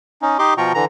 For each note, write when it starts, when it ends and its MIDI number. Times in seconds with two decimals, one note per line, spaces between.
0.22 0.38 61
0.22 0.38 63
0.39 0.54 63
0.39 0.54 67
0.39 0.54 75
0.39 0.54 84
0.39 0.54 86
0.58 0.72 47
0.58 0.72 53
0.58 0.72 65
0.58 0.72 79
0.58 0.72 82
0.58 0.72 85
0.74 0.85 50
0.74 0.85 52
0.74 0.85 82